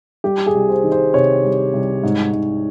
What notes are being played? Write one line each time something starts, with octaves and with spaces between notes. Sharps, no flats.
G3 G4
G#4
C2
C5
D#3
C5
C3 C#5
G3
C2
G#2
G#2